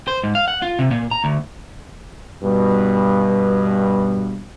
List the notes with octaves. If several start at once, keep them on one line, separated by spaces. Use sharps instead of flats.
C5
G#2
F5
F#5
F4
C3
A#2
A#5
D2
G2 B2